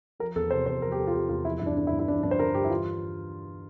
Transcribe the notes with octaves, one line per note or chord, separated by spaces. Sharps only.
F3 A#4
E2 A4
C3 C5
E2 C5
F3 A#4
G4
E2 A4
F4
C3 G4
E2 F4
F3 E4
G2 E4
D4
D3 D4
E4
G2
E4
F3 D4
G2 D4
C5
D3 A#4
G2 G4
E4
E3 F4